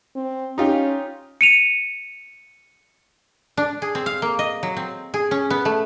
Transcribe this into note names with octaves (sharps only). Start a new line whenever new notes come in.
C4
C#4 D#4 F4 G4
C#7 D#7 F7
D4
G#4
C4
F5
A#3
D#5
F#3
C4
G#4
C#4
B3
A3